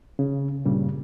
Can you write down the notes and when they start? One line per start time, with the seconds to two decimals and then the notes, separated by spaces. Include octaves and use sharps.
0.19 C#3
0.65 G2 A#2 C#3 G3